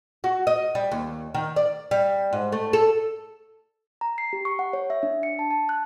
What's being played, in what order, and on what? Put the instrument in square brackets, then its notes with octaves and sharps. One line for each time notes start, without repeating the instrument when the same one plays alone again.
[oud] F#4
D#5
G3
D#2
D#3
D5
G3
G#2
A3
A4
[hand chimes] A#5
C7
G4
C#6
F#5
C#5
E5
D4
C#7
A5
A5
F#6